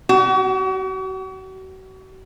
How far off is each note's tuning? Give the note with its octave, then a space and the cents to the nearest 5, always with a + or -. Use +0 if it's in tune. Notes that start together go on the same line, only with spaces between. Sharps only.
F#4 +40